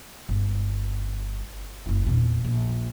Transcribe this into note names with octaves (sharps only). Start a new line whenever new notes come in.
G1
F#1 E4
E2 A#2
A#1